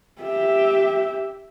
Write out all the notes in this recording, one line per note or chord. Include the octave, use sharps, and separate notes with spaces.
G4 E5